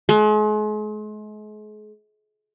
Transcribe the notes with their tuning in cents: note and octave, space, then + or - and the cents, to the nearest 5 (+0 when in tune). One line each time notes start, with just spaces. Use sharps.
G#3 +40